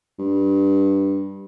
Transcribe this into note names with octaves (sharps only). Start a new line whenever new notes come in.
G2